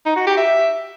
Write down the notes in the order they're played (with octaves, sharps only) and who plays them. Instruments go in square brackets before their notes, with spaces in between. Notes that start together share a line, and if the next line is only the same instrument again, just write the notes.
[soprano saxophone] D#4
F#4
G4
E5